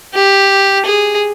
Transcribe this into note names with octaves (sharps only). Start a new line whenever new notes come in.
G4
G#4